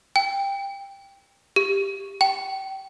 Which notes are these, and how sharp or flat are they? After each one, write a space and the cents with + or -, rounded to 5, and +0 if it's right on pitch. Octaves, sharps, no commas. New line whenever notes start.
G5 +15
G4 +10
G5 -30